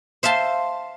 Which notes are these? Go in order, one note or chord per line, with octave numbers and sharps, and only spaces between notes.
C5 E5 F5 A5 C6